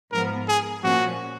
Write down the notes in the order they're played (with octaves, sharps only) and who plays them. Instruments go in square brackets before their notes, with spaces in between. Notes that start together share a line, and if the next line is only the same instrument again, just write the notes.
[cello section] G#2 F3 B3 [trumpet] A#4
[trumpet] G#4
[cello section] A#2 F3 A#3 C#4 [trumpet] F#4